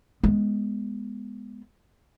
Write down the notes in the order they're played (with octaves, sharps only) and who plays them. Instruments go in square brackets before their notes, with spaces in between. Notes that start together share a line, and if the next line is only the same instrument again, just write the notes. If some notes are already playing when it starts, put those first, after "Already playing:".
[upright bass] G#3 B3